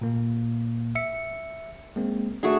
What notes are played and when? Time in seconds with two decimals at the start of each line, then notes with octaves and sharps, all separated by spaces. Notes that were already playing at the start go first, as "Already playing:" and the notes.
0.01 A#2 A#3
0.95 E5 C#7
1.96 G#3 A#3 C4
2.43 A3 D4 F#4 G#4